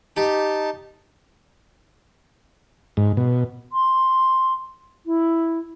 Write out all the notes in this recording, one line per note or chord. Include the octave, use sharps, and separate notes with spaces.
D#4 G4 A5
G#2
B2
C6
E4